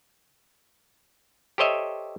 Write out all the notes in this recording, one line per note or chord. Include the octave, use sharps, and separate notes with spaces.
G4 A4 C5 C#5 D#5 E5